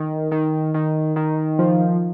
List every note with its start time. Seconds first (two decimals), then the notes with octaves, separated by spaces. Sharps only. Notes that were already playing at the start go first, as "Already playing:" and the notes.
Already playing: D#3
0.31 D#3
0.74 D#3
1.16 D#3
1.59 F3